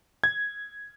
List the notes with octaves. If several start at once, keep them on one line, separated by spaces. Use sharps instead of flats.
G#6